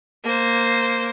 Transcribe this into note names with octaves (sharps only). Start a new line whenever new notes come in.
A#3 C5